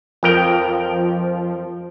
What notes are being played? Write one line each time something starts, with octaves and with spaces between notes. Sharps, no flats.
F2 F3 A#4 G5